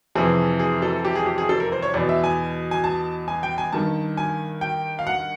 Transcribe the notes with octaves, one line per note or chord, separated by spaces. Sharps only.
F2 C3 E3 G#4
G#4
A4
G4
G#4
G4
G#4
A4
A#4
C5
C#5
E2 B2 D5
E5
G#5
G#5
A5
G#5
G5
G#5
G2 D#3 A5
G#5
G5
F5
F#5